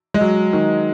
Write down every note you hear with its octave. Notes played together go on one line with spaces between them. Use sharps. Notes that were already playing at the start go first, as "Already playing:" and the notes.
G#3
F#3
D#3